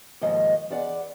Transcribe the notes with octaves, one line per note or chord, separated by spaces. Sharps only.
D#2 G#2 F3 D#5
E2 D5 F#5